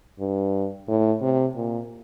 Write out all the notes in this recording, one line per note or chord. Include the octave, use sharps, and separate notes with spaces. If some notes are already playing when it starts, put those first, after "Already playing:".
G2
A2
C3
A#2